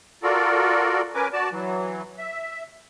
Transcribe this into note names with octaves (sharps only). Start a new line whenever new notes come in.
F4 F#4 A4 A#4 D5
C#4 A#4 B4 G#5 D6
F#4 D5 A5
E3 F#3
E5